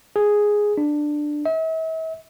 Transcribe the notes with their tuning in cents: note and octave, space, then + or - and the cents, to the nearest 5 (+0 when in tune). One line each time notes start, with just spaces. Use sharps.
G#4 +0
D4 +15
E5 -40